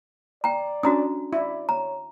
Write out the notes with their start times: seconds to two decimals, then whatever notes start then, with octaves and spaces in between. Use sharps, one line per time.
0.44 D5 G5 A#5
0.83 C#4 D4 F#4 A#5 D#6
1.33 E4 D5
1.69 C#5 A#5